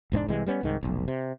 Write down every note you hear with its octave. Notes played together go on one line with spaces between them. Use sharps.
E1 G#2 A#3 D4
C2 C3 E3 G#3
G3 B3 C#4
C2 G#2 D#3
F1 B1
C3